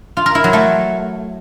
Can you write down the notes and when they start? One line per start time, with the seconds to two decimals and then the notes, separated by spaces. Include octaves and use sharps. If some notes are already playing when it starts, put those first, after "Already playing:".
0.17 F4
0.26 A#4
0.35 E4
0.44 F#3
0.53 A3